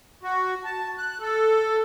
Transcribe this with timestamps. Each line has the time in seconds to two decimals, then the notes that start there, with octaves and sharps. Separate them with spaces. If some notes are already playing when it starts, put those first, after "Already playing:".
0.23 F#4
0.64 A5
0.98 F#6
1.20 A4